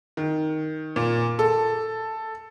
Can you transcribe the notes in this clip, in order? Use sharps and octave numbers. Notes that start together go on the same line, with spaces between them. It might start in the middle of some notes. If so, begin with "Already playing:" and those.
D#3
A#2
A4